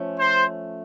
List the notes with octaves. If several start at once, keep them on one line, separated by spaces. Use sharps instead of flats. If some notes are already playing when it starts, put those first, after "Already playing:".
Already playing: F3 A3 C#4
C5